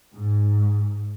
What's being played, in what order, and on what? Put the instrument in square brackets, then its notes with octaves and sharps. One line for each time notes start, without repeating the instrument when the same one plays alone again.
[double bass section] G#2